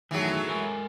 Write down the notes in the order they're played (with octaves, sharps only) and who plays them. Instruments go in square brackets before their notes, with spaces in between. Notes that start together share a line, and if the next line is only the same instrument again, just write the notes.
[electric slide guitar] F#2 D#3 [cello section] A2 G#4 A4 [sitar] E3 F#3
[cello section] G#3 [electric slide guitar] A4 A#4 G#5